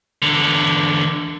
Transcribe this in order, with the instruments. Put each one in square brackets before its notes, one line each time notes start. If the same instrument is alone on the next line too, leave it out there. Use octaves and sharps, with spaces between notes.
[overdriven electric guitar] E2 D3